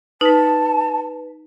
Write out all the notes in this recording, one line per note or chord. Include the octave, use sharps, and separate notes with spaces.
D#4 B4 A5 B6